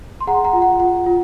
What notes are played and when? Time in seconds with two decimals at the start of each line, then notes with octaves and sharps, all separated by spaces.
0.21 C6
0.27 G#4 F#5 A#5
0.45 F#5 A#5
0.53 F4
0.62 F#5
0.80 F4 F#5
1.06 F4